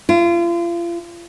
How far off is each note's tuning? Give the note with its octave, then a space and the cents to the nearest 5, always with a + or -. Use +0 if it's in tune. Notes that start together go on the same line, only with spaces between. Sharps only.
F4 -35